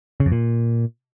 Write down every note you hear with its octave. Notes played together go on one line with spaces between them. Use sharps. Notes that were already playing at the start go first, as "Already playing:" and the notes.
C#3
F2
A#2